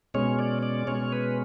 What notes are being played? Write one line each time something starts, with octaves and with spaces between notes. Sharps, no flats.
B2 G#3 C#4 C#5
D5
D5
B2 G#3 C#4 C#5
B4